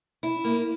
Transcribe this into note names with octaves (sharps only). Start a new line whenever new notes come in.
E4
A#3